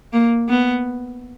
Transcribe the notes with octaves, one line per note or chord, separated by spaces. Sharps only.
A#3
B3